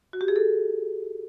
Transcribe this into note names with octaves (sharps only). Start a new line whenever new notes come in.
F#4
G4
G#4
A4